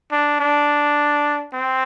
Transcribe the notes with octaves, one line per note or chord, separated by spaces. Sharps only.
D4
D4
C4